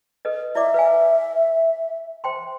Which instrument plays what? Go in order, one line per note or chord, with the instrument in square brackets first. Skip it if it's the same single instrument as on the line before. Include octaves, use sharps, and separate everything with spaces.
[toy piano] A4 B4 D#5
[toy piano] E4 D5 D6 [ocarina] E5
[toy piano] B4 F5 G#5
C5 G5 C6